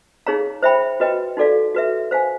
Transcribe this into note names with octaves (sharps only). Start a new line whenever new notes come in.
D#4 G#4 C#5 F5 A#5
C5 E5 G5 B5
F#4 B4 D#5 G5
D#4 F#4 A4 D5 F5
F#4 B4 E5
C5 F5 G#5